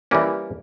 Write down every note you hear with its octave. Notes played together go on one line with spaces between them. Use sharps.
E3 G3 A#3 C#4